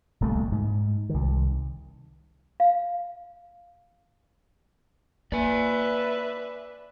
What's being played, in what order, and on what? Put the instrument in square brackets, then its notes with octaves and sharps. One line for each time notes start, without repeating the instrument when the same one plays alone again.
[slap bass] D1 C2 A3 A#3
G#2
C2 D#3
[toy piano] F5
[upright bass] A#3 [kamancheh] B4 E5 [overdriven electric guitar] D5 G#5